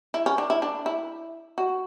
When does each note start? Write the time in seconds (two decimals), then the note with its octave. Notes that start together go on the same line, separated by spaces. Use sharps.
0.14 E4
0.26 C#4
0.38 D4
0.50 E4
0.62 D4
0.86 E4
1.58 F#4